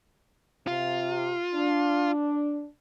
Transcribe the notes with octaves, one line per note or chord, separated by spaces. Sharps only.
C3 F4
D4